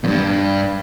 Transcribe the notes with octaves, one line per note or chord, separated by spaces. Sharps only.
E2 G2